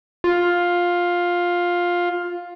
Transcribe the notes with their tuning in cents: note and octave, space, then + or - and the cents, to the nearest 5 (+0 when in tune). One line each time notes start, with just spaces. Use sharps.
F4 +10